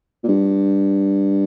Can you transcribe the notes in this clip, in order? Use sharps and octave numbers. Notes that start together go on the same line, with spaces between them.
A#2
G2